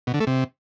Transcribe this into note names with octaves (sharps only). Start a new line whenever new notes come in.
B2
D3
A3
C3